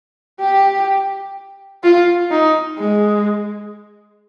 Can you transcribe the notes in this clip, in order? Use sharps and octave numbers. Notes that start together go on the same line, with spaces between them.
G4
F4
D#4
G#3